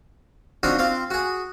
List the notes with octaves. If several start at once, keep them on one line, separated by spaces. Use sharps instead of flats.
C4 D4 D#4 F4 F#4
C4 F4 F5
F#4 G#4